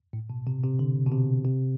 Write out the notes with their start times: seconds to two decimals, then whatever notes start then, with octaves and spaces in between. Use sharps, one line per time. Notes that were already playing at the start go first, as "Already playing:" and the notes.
0.13 A2
0.30 B2
0.47 C3
0.63 C3
0.79 D3
1.06 B2
1.11 C3
1.45 C3